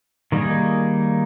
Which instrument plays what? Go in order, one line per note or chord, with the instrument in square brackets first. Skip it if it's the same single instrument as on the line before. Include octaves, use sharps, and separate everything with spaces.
[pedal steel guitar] D#3 G3 A#3 D#4 G#4